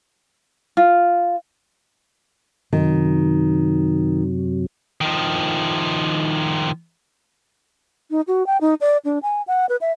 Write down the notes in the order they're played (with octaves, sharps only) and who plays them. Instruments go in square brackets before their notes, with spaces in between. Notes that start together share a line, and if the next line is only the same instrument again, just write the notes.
[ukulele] F4
[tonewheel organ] F#2 C3 F#3 [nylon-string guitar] D#3
[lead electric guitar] D#3 F3
[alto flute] D#4
F#4
G5
D#4
D5
D4
G#5
F#5
B4
E5